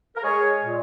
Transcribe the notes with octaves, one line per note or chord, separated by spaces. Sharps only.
A#4
G#3 G#4 C#5
A#2